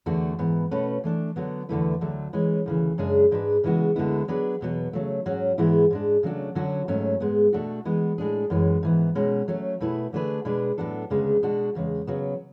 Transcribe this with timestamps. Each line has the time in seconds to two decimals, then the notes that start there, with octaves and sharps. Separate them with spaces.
0.06 E2 D3 A3 D4 F#4
0.39 G#2 E3 B3
0.71 B2 A3 C#4 F#4 B4
1.04 E3 A3 D4
1.36 D3 F#3 B3
1.69 E2 D3 A3 E4 B4
2.01 D2 D3 F#3 A3
2.33 E3 G#3 C#4
2.66 D2 C#3 E3
2.98 F#2 C#3 G#3 D4 G#4
3.31 G#2 G#3 D4 G#4 B4
3.63 C#3 E3 G#3 B3 F#4
3.96 D2 D3 G#3 B3 E4
4.28 F#3 B3 D4 G#4 B4
4.61 E2 B2 F#3 B3
4.93 C#3 F#3 A3
5.26 G#2 F#3 C#4 F#4
5.58 G#2 E3 G#3 B3 E4
5.90 G#2 G#3 D4
6.23 C#3 F#3 A3 D4 F#4
6.55 D3 F#3 C#4 F#4
6.88 G#2 F#3 A3 C#4
7.20 G#2 G#3 B3
7.53 B2 A3 D4 F#4
7.85 E3 G#3 B3
8.18 A2 G#3 D4 G#4
8.50 F#2 E3 G#3 C#4
8.83 G#2 E3 B3
9.15 B2 G#3 C#4
9.48 F#3 A3 C#4
9.80 B2 A3 E4 G#4 B4
10.13 D3 A3 D4 G#4 B4
10.45 B2 G#3 D4 G#4 B4
10.78 A2 F#3 B3 D4 A4
11.10 D2 C#3 G#3 B3 D4
11.43 B2 G#3 D4 F#4
11.75 E2 C#3 G#3
12.07 C#3 F#3 B3